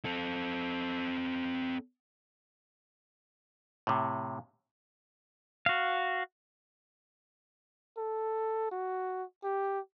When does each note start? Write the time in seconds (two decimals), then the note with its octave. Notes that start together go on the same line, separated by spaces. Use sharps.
0.05 C4 A4
3.87 A2 C3
5.66 F#4 F5
7.97 A4
8.71 F#4
9.43 G4